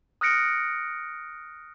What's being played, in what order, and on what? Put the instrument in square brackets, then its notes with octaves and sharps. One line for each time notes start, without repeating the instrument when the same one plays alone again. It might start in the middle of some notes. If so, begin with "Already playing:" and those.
[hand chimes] D#6 F6 F#6 A#6 C#7 D7